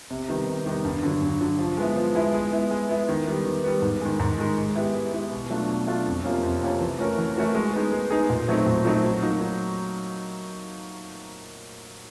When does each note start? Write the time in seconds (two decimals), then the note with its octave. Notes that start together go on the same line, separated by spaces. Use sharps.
0.11 C3
0.28 D#3 G3 B3 D#4
0.47 C3
0.66 D#3 G3 B3 D#4
0.85 G2
1.03 D3 F#3
1.22 G2
1.41 D3 F#3
1.59 F3
1.77 G#3 B3 E4
1.96 F3
2.15 G#3 B3 E4
2.34 G#3
2.52 B3 E4
2.71 G#3
2.89 B3 E4
3.09 D#3
3.27 G3 B3
3.45 D#3
3.64 G3 B3
3.82 G#2
4.01 D#3 G#3
4.20 G#2
4.38 D#3 G#3
4.57 G#3
4.76 B3 E4 G4
4.94 G#3
5.13 B3 E4 G4
5.32 B2
5.50 F#3 A3 D4 F4
5.69 B2
5.87 F#3 A3 D4 F4
6.06 F2
6.24 C3 F3 A#3 C#4
6.43 F2
6.61 C3 F3 A#3 C#4
6.80 E3
6.99 A3 C#4 F#4 A#4
7.18 E3
7.36 A3 C#4 F#4 A#4
7.55 G#3
7.74 B3 D#4 G#4
7.92 G#3
8.10 B3 D#4 G#4
8.30 A#2
8.48 F#3 A3 C4 D#4
8.66 A#2
8.85 F#3 A3 C4 D#4
9.03 F#3
9.22 A#3 D#4 F#4
9.41 F#3